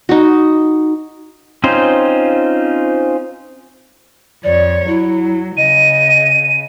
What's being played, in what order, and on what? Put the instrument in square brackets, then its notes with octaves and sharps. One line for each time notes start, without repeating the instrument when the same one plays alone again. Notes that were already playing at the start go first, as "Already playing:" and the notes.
[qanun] D#4 F#4
[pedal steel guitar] C4 C#4 D#4 F4 C5
[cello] F2 C#5 [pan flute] D5
[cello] F#3 [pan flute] E4
[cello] C#3 [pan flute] D#5 [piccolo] D#7